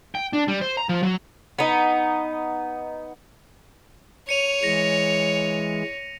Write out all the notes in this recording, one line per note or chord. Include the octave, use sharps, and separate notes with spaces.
G5
D4
G3
C5
A#5
F3
F#3
B3 D#4
C#5 C#7 D#7 F7
E3 G#3 A#6 C#7